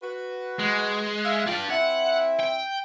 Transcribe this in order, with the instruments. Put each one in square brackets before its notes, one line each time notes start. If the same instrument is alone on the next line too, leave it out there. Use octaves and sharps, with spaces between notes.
[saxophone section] F#4 B4
[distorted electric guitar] G#3
[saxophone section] E5 F5
[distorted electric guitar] D4 G5 [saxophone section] F4
[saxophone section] C4 E4 E5 [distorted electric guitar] F#5
[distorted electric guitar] G5